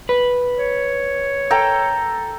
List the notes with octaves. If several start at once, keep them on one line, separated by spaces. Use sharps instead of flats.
B4
C#5
A4 G5 A#5